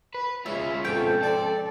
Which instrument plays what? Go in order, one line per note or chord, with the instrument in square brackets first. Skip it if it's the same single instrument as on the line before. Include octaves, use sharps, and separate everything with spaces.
[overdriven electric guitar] B4
[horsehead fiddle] G#3 [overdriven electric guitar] C#4 F4 [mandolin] E5
[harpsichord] F2 G#2 B2 [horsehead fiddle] A4 [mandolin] G5
[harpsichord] C4 [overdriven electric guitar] D5